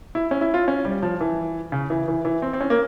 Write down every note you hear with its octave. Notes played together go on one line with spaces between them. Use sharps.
E4
C#4
E4
F4
C#4
G3
F3
E3
C#3
E3
E3
E3
C4
C4
C#4
A#3